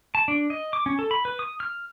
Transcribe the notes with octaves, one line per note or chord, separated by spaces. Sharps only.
A5
D4
D#5
D6
C#4
A4
B5
B4
D#6
F6